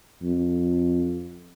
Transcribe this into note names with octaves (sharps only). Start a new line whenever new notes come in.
F2